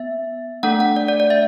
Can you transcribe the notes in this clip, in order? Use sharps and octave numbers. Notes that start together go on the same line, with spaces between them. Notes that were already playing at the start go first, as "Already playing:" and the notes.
Already playing: B3 E5
A3 D4 A4 F#5
F#5
D5
D5
D5
E5